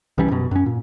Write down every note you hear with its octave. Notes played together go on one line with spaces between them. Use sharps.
C2 E3 G3 C#4
F#2 B2
F#2 C#4
A#2